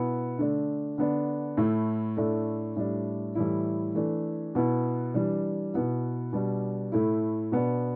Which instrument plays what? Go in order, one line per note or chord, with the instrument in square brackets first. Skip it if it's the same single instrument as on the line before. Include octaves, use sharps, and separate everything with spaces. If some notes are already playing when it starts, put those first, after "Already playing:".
Already playing: [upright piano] B2 B3 E4
D3 A3 D4
D3 B3 D4
A2 A3 E4
A2 A3 D4
A2 G3 D4
A2 E3 G3 E4
E3 A3 D4
B2 B3 E4
E3 G3 D4
B2 B3 E4
B2 G3 D4
A2 A3 E4
B2 B3 D4